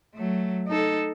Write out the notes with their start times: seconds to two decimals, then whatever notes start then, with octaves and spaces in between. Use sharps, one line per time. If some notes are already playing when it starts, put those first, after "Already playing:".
0.14 F#3 A3
0.67 D#4 A4